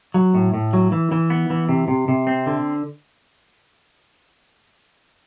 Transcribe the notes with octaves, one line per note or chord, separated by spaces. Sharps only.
F#3
A2
A2
F#3
E3
E3
B3
E3
C3
C3
C3
C4
D3